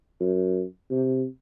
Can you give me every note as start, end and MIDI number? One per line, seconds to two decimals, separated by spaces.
0.20 0.63 42
0.91 1.25 48